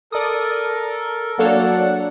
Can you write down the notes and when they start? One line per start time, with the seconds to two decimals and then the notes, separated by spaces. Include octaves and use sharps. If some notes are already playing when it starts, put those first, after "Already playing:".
0.12 A4 A#4 D5 D#6
1.39 F#3 A#3 D4 A4 C#5 D5 F#5